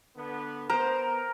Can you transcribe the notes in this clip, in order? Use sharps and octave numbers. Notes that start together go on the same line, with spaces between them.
D3 B3
B3 A#4 C5 A#5